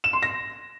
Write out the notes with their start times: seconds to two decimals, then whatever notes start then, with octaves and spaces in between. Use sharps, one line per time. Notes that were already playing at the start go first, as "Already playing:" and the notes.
0.04 E7
0.13 C6
0.22 A#6